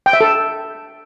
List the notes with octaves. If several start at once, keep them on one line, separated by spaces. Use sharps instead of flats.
G5
E5
A4